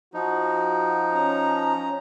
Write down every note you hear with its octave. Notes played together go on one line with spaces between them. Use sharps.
F3 D#4 F#4
C#4 A#5